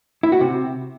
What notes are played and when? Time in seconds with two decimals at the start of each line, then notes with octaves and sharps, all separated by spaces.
0.23 E4
0.32 F#4
0.41 C3